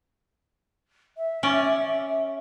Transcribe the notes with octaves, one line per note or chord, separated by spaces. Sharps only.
E5
C#4 D5